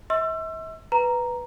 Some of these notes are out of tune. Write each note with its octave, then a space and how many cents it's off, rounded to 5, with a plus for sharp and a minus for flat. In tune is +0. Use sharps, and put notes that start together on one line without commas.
E5 -40 C6 +35 E6 +30
B4 +0 A#5 +0